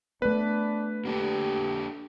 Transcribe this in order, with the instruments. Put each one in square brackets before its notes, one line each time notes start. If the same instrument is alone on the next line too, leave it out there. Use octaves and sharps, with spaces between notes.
[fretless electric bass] A3 B3 [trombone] D4 [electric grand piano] B4
[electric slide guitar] A#3 D4 A4 [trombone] G4